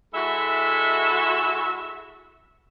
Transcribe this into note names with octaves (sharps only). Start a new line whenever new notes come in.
G#3 E4 F#4 A4 E5